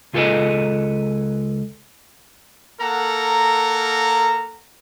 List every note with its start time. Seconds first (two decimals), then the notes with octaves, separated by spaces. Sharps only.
0.13 C#2 F4 G#4 A4 B4 D#5
2.80 A#3 A4 A#4 F#5 A#5